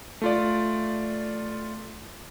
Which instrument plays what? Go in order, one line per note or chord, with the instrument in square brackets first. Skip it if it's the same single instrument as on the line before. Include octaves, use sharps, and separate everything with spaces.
[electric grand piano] A3 F4 D5